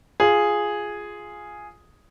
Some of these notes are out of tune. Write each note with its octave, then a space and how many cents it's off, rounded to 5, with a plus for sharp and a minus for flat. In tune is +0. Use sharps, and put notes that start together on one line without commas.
F4 +0 G#4 +0